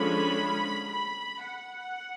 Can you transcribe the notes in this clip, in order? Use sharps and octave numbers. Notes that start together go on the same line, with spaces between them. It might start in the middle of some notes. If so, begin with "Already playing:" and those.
Already playing: D3 F3 G#3 C#4 B5
B5
F#5